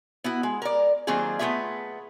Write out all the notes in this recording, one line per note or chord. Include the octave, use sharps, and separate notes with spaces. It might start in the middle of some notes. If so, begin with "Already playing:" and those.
B3 E4 F#4
G#3
A#4 D5
D#3 F#3 A#3 C4 F4 G#4
A3 B3 E4 F4 G#4 E5